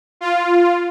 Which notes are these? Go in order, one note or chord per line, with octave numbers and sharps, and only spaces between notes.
F4